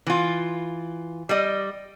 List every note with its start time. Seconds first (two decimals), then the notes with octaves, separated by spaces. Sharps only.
0.07 E3 F4
1.29 G3 D5 D#5